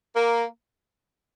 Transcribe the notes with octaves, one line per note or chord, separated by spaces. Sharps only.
A#3